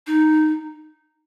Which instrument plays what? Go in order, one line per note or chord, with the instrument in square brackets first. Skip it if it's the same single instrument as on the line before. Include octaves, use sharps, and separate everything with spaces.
[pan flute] D#4